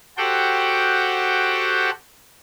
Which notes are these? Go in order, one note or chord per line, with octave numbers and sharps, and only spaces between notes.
F#4 G4 A4 C5 F#5 G5